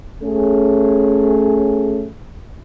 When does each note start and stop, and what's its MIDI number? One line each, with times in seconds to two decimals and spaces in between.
0.23 2.06 57
0.23 2.06 61
0.23 2.06 68